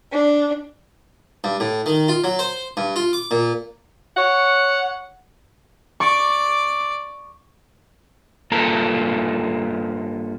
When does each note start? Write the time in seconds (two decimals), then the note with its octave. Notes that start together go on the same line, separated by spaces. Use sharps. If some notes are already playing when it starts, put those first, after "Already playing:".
0.11 D4
1.44 G2
1.60 A2
1.86 D#3
2.08 F4
2.24 F#3
2.39 C5
2.77 G2
2.96 F4
3.13 D6
3.31 A#2
4.16 C#5 F#5
6.00 D5 C#6 D6
8.52 G2 A#3 F4 A4 A#5